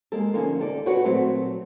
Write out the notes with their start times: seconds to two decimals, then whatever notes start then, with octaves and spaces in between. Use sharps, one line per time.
0.12 G#3 A#3 A4
0.34 D3 F3 A#3 C#4 D#4
0.59 D#3 A4 D5
0.86 F#4 A4 B4 C#5 D5
1.05 A#2 F#3 A3 C4